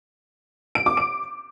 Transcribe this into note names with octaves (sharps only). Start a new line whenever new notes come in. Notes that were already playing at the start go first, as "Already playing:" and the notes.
D7
D6
D7